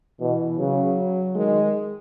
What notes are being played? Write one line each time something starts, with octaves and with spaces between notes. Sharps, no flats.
B2 E3
C#3 F#3
D#3 G#3